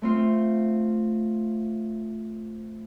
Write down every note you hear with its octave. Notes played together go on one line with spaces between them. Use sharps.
A3 C4 F4